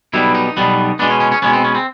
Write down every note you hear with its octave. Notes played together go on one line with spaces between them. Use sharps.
B1 B2 G3 B3 E4
D#4
B1 B2 G3 B3
B2 G#3 B3 D4
C#4
C#4
C#4
B2 G#3 B3 C#4
C4
C#4
C4